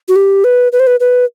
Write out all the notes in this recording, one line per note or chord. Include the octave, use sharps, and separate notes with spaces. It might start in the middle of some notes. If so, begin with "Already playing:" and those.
F#4
G4
B4
B4
C5
B4
B4